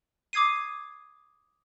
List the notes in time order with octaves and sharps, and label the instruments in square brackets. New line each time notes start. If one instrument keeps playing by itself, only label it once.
[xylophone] D6 D#6 G#6 C7 D#7